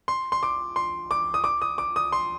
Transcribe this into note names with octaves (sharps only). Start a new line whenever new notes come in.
C6
C6
D6
C6
D6
D#6
D6
D#6
D6
D#6
C6